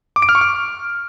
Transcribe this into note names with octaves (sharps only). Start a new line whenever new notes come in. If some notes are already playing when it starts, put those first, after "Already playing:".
D6
D7
F6
C#6
F6